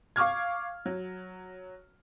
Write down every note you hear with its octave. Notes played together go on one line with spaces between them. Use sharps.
F5 C#6 D6 F6 G#6
F#3